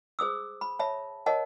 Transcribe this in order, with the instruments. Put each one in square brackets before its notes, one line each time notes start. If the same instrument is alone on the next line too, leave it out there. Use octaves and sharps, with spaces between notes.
[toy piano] G#4 C5 D#6 E6
B5
C#5 E5 A5 B5
A#4 C#5 D#5 F#5 A5